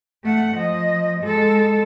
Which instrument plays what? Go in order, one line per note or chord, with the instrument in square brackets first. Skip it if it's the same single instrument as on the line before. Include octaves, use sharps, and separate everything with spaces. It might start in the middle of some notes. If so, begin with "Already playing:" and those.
[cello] A3 F#5
F3 D#5
G#3 A4